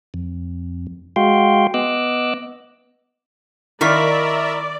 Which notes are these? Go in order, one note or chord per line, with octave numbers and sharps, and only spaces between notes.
F2
G#3 F#4 F5 G5 C6
B3 D#5 D6 E6 F#6
D#3 E4 F4 A#4 D5 E5 C#6 B6